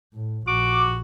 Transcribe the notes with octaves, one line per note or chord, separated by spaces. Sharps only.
A2
A#1 F#4 D6